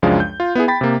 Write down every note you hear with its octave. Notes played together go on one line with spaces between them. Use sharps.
C#2 F#2 F3 G#3 D4 F5
G6
F4
B3 E4 G#4
G5 B5 A6 B6
C3 A#3